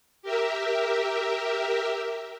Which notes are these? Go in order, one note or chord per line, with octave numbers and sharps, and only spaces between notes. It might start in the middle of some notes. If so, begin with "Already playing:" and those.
G4 A#4 E5